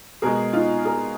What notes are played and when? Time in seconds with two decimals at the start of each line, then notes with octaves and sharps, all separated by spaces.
0.22 B2 G#3 G#4 A#4
0.53 D#4 F4
0.85 G#4 A#4